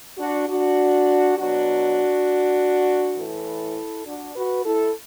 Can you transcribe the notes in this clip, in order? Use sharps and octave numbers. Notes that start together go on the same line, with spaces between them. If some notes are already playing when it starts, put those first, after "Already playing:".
D4 F#4
D4 F#4
B2 F#3 D4 F#4
A2 E3 E4 A4
D4 F#4
F#4 B4
E4 A4